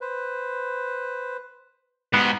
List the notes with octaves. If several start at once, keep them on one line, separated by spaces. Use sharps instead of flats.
B4 C5
G#2 B3 F#4 G4